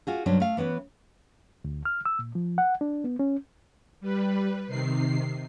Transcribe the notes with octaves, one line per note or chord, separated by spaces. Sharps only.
F4 F#4 G#4
G2 C3 F#3 C#4 D4
A3 F5
E3 B3 C#4 B4
D2
F6
E6
A#2
F3
F#5
D4
B3
C#4
G3 B4
C3 D#3 C7